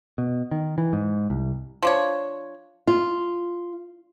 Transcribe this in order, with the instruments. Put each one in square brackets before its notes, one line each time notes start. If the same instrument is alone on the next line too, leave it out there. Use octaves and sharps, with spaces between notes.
[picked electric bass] B2
D#3
E3
G#2
C2
[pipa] F3 D4 C#5
[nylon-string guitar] F4